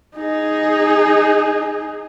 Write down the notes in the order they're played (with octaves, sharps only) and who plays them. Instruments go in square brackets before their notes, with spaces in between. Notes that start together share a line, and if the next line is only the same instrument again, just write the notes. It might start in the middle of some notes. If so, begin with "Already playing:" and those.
[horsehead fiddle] D#4 G#4